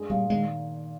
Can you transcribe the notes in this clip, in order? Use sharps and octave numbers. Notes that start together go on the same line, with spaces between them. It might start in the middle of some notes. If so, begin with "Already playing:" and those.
Already playing: G2 G#3
A#2 G3
D#3 G#3